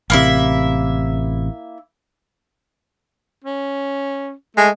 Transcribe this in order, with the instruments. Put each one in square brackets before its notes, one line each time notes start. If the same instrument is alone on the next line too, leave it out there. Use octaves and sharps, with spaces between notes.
[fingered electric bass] A1 C3 [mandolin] A#3 E4 E5
[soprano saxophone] C#4
[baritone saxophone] G#3 [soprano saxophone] A3